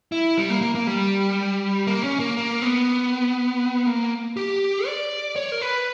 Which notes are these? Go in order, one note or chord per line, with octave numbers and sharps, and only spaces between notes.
E4
G3
A#3
A#3
A#3
G3
A#3
C#4
A#3
A#3
B3
A#3
G4
D5
C#5
A#4
B4